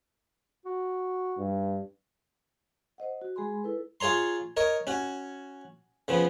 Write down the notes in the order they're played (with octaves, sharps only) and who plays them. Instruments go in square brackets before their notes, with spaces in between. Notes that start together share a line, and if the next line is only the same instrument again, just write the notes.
[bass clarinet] F#4
[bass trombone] G2
[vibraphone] C5 D#5 F#5
F#4
G#3 G#4 G#5 B5 C6
E4 A4 B4
[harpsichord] F4 G#4 C#5 A#5 C6
A#4 C#5 D#5
C#4 F#4
C#3 F3 B3